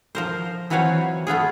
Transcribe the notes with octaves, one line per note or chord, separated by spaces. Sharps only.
F3 A#4 C5
E3 F#3 C4 B4 C#5 F5
A3 B3 F4 G#4